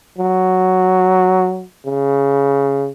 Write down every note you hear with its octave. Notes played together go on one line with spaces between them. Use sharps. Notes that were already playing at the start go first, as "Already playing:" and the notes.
F#3
C#3